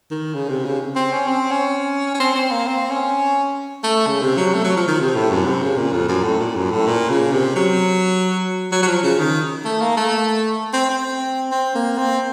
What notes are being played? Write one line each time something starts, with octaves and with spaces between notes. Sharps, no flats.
D#3
C#3
C3
C#3
C4
C#4
C4
C#4
C#4
C4
C4
A#3
C4
C#4
A3
C#3
C3
F#3
A3
F#3
F3
D#3
C3
A2
F#2
C3
C#3
A#2
F2
F#2
A2
A#2
F#2
A2
A#2
C#3
C3
F#3
F#3
F#3
F3
C#3
D#3
A3
A#3
A3
C4
C4
C4
A#3
C4